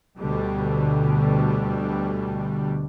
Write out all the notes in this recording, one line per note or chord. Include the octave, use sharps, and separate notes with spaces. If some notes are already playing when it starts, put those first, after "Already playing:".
D2 B2 D3 G3